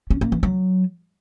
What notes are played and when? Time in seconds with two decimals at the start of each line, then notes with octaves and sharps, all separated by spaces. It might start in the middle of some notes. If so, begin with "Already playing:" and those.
0.10 C#4
0.21 A#3
0.32 E3
0.43 F#3